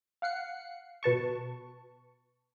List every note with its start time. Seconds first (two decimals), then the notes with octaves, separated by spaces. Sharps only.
0.22 F5 F#5 C7 C#7
1.03 B2 B4 A5 C#6